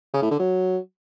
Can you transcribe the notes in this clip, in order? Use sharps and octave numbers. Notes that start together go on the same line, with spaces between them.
C#3
A2
D3
F#3